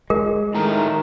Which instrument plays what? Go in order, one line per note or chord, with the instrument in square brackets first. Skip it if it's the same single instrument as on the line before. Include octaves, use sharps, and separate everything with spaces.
[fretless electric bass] G#3 [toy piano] A#4
[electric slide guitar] A2 A3 A#5 [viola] D#3